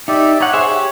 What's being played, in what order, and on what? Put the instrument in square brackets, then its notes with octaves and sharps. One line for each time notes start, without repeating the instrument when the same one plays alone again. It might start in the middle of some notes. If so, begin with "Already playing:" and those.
[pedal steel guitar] D#4 [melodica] G4 D5 E5
[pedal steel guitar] D#4 F#5 [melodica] C#5
[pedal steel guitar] G#4 C5 E5
G4